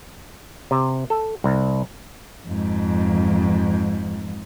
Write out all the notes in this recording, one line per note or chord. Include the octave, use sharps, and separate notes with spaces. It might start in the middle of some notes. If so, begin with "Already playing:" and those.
C3
A4
C2
F2 G#2